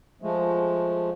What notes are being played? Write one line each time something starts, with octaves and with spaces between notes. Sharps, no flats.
F3 G#3 A3